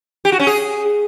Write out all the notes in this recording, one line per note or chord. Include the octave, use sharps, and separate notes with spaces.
G4
F#4
C#4
G#4